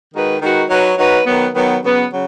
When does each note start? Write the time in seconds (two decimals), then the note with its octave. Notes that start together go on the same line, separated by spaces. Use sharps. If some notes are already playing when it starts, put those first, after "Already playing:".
0.13 D#3 G#3 D#4 F#4 B4
0.41 D#3 G#3 D#4 F#4 B4
0.69 F#3 D#4 F#4 B4
0.97 F#3 D#4 F#4 B4
1.25 D#3 F#3 B3
1.54 D#3 F#3 B3
1.82 C#3 F#3 B3
2.10 C#3 F#3